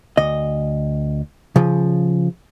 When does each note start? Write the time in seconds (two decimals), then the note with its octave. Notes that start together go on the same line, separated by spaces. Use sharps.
0.17 D2 D#5
1.56 C#3 F3